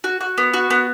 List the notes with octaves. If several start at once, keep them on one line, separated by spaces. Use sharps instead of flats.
F#4
F#4
B3
F#4
B3